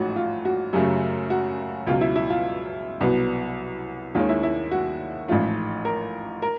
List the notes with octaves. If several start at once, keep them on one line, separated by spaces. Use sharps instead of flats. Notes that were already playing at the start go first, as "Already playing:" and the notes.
Already playing: A1 G#2 F3 A3 C#4 F#4
F4
F#4
F#2 C#3 F#3 A3 G4
F#4
C#2 B2 F#3 F4
E4
E4
F4
C2 B2 F#3 B3
D#2 D#3 G#3 C#4 F4
E4
E4
F#4
A1 G#2 F3 A3 F4
A#4
A#4